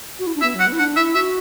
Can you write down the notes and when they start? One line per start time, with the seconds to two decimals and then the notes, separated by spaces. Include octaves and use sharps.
0.19 F#4
0.26 E4
0.35 D4
0.41 B3 E5
0.54 F#3
0.60 F#5
0.67 B3
0.72 E4
0.79 D4 F#5
0.96 E4 E5
1.15 F#4 E5